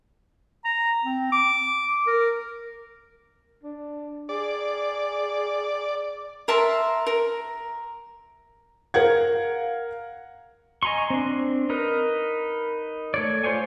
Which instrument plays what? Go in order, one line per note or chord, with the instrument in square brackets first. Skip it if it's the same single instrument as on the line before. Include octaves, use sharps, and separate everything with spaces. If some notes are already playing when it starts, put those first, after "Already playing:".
[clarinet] A#5
C4
D6
A#4
[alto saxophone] D4
[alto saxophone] G#4 [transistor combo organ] D5
[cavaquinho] A#4 E5 A5 C6
A#4
[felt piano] A#4 F5 F#5 G#6
[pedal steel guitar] D#5 G#5 A#5 C6 C#6
C4 D4
D#4 A#4 B4
A3 C#5 D5
F4 C5 C#5 G#5